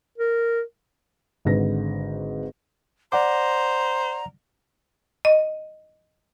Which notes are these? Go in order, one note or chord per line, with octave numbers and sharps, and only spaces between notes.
A#4
G#1 G#2 D3 B4 A#6
C5 D5 F#5 A#5 D6
D#5